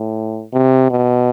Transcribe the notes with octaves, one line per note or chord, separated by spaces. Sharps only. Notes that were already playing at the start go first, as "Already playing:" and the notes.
Already playing: A2
C3
B2